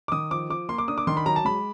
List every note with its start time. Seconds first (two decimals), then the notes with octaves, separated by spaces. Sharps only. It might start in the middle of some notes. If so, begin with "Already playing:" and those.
0.08 D6
0.12 D#3 D#6
0.31 F3 D6
0.50 F3 D6
0.69 A#3 C6
0.78 D6
0.88 D4 D#6
0.98 D6
1.07 D#3 C6
1.17 B5
1.26 F#3 A#5
1.36 A5
1.45 G#3 B5